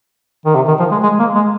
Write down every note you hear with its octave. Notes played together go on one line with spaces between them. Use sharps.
D#3
C3
D#3
F3
G#3
G#3
A#3
G#3